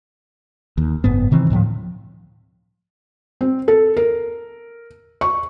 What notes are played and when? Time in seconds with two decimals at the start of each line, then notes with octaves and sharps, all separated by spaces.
0.78 D#2
1.04 F#1 G#2 B3
1.31 C3 D#3 E3 C4
1.50 D2 A2 E3 F3
3.41 C4
3.68 A4
3.97 A#4
5.21 C#6